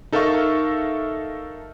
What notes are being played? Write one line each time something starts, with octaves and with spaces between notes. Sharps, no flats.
D#4 A4 A#4 E5 F5 C#6